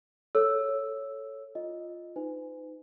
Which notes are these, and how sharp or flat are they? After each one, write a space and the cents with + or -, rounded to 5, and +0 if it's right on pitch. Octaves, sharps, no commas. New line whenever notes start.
A4 +0 C#5 +0 E6 +0
F4 +0 D#5 +0
D#4 +5 B4 +45 G#5 +0